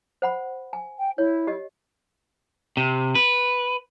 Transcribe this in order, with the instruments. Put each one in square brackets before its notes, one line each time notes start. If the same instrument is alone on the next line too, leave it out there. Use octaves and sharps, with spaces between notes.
[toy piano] C5 F#5 B5
G#5
[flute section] G5
[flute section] E4 [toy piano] C#5
[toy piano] G4 D#5
[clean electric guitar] C3
B4